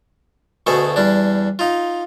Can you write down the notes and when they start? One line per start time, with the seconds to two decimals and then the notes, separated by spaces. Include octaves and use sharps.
0.67 D2 B2 A3 G#4 A4
0.96 E2 G3 D4
1.59 D#4 F4